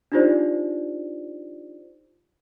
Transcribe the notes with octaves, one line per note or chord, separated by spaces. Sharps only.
D4 D#4 F4 G4 C5 D5